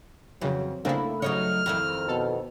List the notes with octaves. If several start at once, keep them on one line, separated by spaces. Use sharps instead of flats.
F2 C#3 E3 F#3
C#3 A3 A#3 C4 D4 E4
C#3 F#3 D#4 C#5 F6
F2 D#3 E4
B2 A4